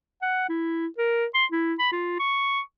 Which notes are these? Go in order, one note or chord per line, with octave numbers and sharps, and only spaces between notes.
F#5
E4
A#4
C6
E4
B5
F4
C#6